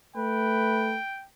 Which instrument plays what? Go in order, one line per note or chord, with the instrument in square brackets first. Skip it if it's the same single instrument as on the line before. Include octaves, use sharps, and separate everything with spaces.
[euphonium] A3 [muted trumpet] B4 [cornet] G5